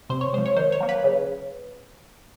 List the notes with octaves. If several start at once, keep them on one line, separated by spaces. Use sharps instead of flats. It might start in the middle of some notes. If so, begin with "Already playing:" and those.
C3 C5
C#5
F3 G#3 C5
C#5
D#3 C5
C#5
F#3 A#3
B4
C#3